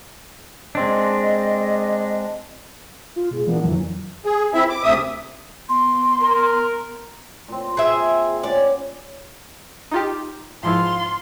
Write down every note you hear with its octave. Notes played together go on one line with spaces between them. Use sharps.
G#3 C4 D4 D#5
F4
B2 G#3
A#2 E3 A#3 B3 D4
F2 D3 E3 F#3
G#4
C4 E4 E5
D6
D2 C3 E5 D#6
B3 C6
A#4
A#2 C4
G#4 E5
B3 C#4 C#5 D5
D#4 F4 G4
G#2 F3 E4 F4 C6